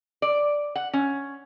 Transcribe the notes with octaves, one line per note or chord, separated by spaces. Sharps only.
D5
F#5
C#4